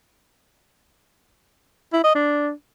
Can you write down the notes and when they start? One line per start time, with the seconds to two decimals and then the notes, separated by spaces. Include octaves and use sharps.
1.93 E4
2.04 D#5
2.15 D4